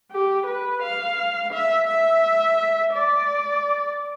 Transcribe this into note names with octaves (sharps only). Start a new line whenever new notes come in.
G4
B4
F5
E5
E5
D5